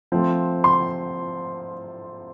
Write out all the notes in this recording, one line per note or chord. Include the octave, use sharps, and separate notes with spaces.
F3 A3 C4
C6